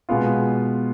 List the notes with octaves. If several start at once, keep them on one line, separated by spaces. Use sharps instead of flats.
B2 G#3 B3 F4